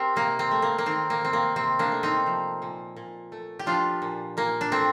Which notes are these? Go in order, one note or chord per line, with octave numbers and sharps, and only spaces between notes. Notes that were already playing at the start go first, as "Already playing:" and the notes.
Already playing: C4 G4 A#4
C3 A#3
C4
A3
A#3
A#3
D#3 C4
A#3
C3 C4
A#3
C3 C4
A#3 D4
A3
C4 D#4
F3
A#2
A#2
A3
G4
F3 D4 F4
A#2
A#2 A#3
D4
A3 C4